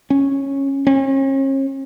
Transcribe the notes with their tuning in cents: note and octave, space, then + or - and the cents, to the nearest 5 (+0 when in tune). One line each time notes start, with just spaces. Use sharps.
C#4 -10
C#4 -40